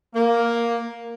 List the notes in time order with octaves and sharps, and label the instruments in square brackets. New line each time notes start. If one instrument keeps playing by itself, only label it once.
[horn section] A#3